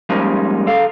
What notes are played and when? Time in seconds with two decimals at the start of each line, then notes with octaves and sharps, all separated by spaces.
0.10 F3 G3 G#3 A#3 C#4 D#4
0.66 C#2 A4 F5